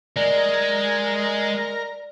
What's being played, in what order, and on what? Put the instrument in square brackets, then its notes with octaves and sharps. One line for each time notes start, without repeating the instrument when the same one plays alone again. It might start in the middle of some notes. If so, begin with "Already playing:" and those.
[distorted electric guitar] G#3 [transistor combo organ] A#4 [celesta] D5